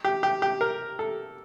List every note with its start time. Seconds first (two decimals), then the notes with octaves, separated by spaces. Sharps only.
0.04 G4
0.23 G4
0.42 G4
0.61 A#4
0.99 A4